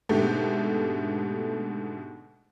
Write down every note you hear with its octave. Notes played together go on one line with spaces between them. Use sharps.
G#2 B2 D3 A3 G4